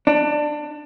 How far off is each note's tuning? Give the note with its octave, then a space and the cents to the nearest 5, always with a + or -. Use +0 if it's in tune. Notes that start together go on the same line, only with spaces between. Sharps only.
D4 +20